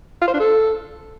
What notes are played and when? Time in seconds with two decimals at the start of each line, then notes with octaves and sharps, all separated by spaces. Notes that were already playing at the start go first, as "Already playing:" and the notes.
0.22 F4
0.28 C5
0.34 D4
0.40 A4